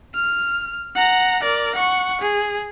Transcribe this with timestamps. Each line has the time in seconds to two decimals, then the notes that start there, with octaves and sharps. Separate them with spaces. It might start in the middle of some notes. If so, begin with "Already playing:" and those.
0.14 F6
0.96 F#5 A#5
1.43 A#4 D5
1.75 F#5 C#6
2.21 G#4